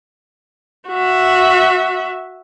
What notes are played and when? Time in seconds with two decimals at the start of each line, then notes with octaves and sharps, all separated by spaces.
0.90 F#4 E5